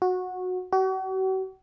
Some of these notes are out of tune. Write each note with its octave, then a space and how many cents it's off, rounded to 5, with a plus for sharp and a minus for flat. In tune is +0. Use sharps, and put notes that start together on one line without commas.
F#4 -15
F#4 +45